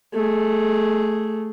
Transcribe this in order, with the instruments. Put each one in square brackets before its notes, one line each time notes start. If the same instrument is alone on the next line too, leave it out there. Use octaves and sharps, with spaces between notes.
[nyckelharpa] A3 G#4